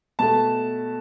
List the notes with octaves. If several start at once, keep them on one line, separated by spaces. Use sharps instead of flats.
B2 A3 A5